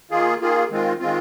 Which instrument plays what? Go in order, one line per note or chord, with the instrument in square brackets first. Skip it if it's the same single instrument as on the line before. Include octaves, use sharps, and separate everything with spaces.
[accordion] D#3 A#3 F4 G#4
D#3 A#3 F4 G#4
D#3 G#3 C4 F4
D#3 G#3 C4 F4